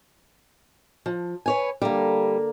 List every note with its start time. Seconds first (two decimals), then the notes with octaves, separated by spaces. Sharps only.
1.06 F3
1.46 B4 C#5 G#5
1.82 D3 G3 A#3